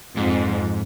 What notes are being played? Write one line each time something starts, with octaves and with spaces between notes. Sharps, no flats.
F2 G#2